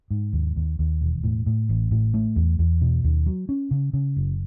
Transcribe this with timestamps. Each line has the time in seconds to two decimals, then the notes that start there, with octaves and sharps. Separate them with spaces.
0.11 G#2
0.33 D#2
0.56 D#2
0.79 D#2
1.01 E1
1.24 A2
1.46 A2
1.69 A1
1.91 A2
2.14 A3
2.36 E2
2.59 E2
2.81 B2
3.04 D#2
3.26 F#3
3.49 C#4
3.71 C#3
3.93 C#3
4.16 F#1